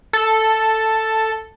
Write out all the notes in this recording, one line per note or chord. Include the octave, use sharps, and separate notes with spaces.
A4